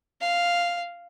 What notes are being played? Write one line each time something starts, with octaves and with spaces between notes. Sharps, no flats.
F5